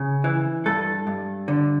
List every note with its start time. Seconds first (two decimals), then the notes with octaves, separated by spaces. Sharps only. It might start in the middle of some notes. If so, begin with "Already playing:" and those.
Already playing: C#3
0.24 E3
0.66 G2 A4
1.07 G2
1.48 D3